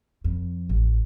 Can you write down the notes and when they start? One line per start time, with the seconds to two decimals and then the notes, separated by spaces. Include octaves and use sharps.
0.24 F2
0.69 A1